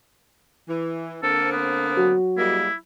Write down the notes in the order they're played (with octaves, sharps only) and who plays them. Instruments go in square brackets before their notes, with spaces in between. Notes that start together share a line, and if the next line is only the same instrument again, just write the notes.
[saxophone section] E3
[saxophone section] D3 A#3 C4 [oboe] A4
[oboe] B3
[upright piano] F#3 F#4
[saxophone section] G3 G#3 A#3 [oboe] E4